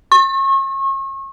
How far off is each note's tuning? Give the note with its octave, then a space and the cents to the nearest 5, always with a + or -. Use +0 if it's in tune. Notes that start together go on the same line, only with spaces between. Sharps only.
C#6 -35